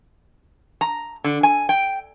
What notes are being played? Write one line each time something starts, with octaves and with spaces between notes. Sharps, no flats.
A#5
D3
G#5
G5